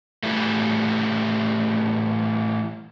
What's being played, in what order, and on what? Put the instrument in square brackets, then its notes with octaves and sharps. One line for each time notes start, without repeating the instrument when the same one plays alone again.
[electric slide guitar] A2 E3 G3 A3